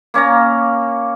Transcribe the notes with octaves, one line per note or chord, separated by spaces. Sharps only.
A#3 C#4 F5 A#5